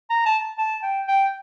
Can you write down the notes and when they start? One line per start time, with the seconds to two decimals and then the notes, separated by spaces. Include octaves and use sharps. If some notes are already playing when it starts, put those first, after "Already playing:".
0.10 A#5
0.26 A5
0.58 A5
0.83 G5
1.07 G5